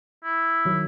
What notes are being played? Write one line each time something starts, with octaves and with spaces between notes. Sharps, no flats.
E4
D#3 F#3